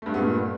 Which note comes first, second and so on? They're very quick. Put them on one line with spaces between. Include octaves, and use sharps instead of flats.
A3 G2 G#3 B3 A#2